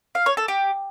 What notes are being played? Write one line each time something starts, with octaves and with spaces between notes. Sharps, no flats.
F5
C#5
A4
G4